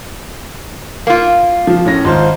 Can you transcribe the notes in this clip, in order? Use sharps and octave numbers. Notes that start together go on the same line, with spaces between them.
A#3 F4
F3
A2 C#4 A#6
G#1 F4 C5